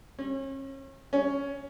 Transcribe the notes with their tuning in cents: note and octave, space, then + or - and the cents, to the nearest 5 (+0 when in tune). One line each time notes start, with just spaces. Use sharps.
C#4 -35
C#4 +10